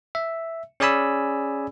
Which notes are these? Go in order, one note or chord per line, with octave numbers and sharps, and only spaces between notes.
E5
C#4 G#4 D5 G#5 B5 E6